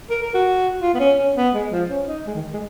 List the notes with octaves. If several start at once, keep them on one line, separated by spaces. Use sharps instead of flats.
A#4
A#4
F#4
F4
B3
C#4
C#4
B3
G#3
F3
C#4
D#4
G#3
D#3
G#3